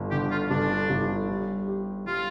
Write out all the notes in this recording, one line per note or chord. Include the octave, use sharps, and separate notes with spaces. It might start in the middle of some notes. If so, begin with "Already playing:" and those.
Already playing: G1
D3 G4
F4
G1 D4
G1
G3
G4
G3 F4